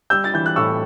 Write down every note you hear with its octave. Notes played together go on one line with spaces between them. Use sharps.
G3 E6 G6
A6
E3 G6
F#6
A2 C#6 E6